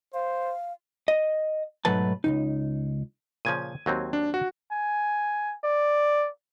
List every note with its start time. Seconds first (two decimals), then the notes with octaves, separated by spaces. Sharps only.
0.14 C5 F5
1.08 D#5
1.85 B1 G#2 F#3 A3 B4 A5
2.24 C#2 C3 D#4
3.45 A#2 C#3 F3 G#6 D#7
3.86 D#2 F#3 C4
4.13 D4
4.34 F#4
4.71 G#5
5.64 D5